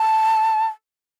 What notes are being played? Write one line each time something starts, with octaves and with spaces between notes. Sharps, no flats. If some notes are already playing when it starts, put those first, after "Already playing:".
Already playing: A5